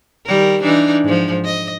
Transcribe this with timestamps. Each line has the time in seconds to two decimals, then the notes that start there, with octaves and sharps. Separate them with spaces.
0.26 D#3 G3 A#4
0.62 E3 D4 D#4
1.04 G#2 F3
1.45 D#5